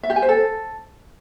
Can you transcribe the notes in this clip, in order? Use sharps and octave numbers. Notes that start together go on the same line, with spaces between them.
E5
G4
G#5
C5
A4